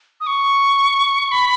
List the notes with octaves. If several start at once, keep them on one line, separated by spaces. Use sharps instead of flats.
D#6
C#6
B5